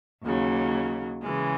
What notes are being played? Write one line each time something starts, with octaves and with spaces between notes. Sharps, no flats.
D#2 C#3 F#3
C#3 E3 G#3